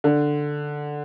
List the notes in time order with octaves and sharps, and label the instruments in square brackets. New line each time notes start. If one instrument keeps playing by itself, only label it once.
[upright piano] D3